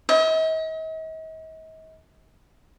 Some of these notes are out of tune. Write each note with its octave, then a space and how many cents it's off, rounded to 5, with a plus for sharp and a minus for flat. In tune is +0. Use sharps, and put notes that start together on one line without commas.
D#5 +45